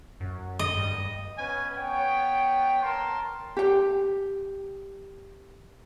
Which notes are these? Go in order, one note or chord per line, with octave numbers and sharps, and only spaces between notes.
F#2
D#5
G2
B3 C#4 B4 G#5
B3 C#5 G5
A#4 A5 C6
G4 G5